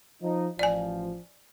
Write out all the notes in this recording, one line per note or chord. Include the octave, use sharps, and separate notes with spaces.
F3 D#4
A1 F3 D5 G#5